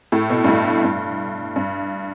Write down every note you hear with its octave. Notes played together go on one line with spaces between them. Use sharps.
A2
B2
G2
A2
G2
G2